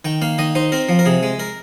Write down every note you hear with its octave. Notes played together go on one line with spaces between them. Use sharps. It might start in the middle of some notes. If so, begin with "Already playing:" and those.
D#3 G5
A#3 F5
D#3 D#5
D#4 C5
C4 A#4
F3
A#4
C3 G#4
G#3
A#4